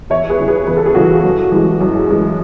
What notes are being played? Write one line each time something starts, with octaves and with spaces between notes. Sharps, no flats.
E2 C#5 E5
G#4 B4
C#3 E3
G#4 B4
E2 B4
A4
G#4
C#3 E3 F#4 A4
F#2
E3 G#3
F#2
E3 G#3